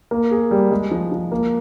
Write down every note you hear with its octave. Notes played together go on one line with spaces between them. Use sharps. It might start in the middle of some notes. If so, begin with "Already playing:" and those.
A#3
G#4
G3
G#3
F3
F3
A#3